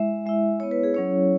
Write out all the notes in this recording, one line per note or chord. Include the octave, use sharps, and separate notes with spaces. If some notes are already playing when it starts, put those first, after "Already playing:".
Already playing: G#3 E4 E5
G#3 E4 E5
B3 E4 C#5
B4
G#4
F#3 C#4 E4 C#5